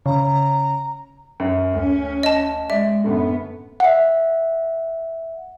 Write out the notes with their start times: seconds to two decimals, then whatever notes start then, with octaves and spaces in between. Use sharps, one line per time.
0.06 C#3 A#5
1.40 F#2
1.74 D2 C#4
2.23 D#5 A5
2.70 G#3 D5 E5
3.04 F#2 A2 D3 B3
3.80 E5 F#5